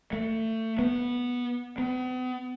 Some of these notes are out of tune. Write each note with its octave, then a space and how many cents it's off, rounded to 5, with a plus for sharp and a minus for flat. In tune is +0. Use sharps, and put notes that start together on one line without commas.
A3 +25
B3 -10
B3 +40